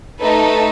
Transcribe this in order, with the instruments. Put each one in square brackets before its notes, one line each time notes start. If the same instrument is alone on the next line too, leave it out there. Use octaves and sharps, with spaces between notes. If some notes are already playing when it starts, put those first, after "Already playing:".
[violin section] A3 D#4 A4 B4